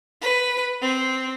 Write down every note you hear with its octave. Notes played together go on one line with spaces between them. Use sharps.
B4
C4